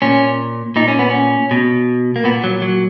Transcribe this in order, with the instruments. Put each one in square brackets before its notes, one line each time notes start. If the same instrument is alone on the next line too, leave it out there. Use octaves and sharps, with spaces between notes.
[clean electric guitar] A#2 C#4
A#2 D#4
C#4
B3
C#4
B2
A#3
A#2 B3
F#3
F#3